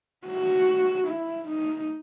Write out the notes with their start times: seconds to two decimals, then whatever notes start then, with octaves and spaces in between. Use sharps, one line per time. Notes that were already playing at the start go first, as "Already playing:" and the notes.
0.27 F#4
1.08 E4
1.48 D#4